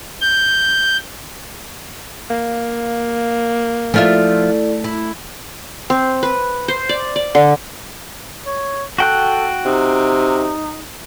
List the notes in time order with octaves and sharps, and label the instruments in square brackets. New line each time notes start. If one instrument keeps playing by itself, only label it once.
[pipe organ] G6
[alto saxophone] A#3 [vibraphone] F5
[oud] F3 F4 E5 [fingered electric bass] A3 [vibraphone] E4 A4 D5
[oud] E4
[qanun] C4
B4
C5
D5
D5
D3
[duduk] C#5
[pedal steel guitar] F#4 G5 F#6 [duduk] A4
[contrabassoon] C3 [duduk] D#4